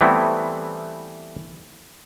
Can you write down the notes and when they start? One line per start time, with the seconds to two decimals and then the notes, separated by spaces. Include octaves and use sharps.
0.01 E3 G3 A3 B3 C4 E4